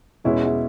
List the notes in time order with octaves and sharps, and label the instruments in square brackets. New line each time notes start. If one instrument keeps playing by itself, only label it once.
[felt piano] E2 B2 G#3 [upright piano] C#4 E4
[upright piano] E4